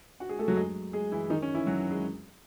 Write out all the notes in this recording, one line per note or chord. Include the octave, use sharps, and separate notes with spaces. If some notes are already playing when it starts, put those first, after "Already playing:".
F#4 F#5
G#3 G#4
A3 A4
F#3 F#4
G#3 G#4
G#3 G#4
E3 E4
D#3 D#4
C#4
E3 E4
F#3 F#4
G#3 G#4